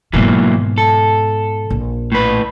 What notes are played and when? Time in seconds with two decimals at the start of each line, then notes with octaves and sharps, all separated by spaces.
0.13 G#2 B2 E3 F#3 A#3
0.78 A4
1.70 A#1
2.12 A2 B4